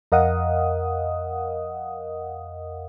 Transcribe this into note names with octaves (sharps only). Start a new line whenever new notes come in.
F2 A#4 D#5 F5 F#5 D#6